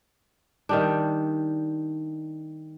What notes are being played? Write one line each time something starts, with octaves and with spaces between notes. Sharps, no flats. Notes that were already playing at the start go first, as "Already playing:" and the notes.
D#3 G3 D4